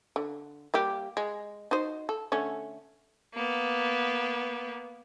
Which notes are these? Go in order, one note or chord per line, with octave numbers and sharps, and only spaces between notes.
D3
G3 A#3 G4
G#3
D#4 F#4 C5
A4
D3 A3 C#4
A#3 B3